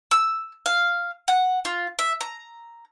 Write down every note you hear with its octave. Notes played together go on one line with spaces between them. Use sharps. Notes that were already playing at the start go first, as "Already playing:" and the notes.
E6
F5
F#5
F4
E5
A#5